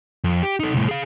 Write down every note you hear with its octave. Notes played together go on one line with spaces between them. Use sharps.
F2
G4
D#4 A4
C2 A2
G#4 F5